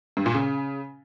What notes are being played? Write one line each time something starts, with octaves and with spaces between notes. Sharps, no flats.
G2
A#2
C#3